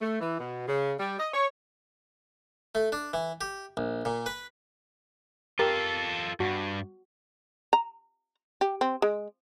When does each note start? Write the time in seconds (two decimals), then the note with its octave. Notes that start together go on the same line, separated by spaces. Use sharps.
0.02 A3
0.20 E3
0.40 B2
0.68 C#3
1.00 G3
1.19 D#5
1.34 C#5
2.75 A3
2.92 D4
3.13 E3
3.41 G4
3.77 A#1
4.05 A#2
4.26 B4
5.59 F4 G4 A4 A#4
6.40 G2 F#4
7.73 A#5
8.61 G4
8.81 C4
9.02 G#3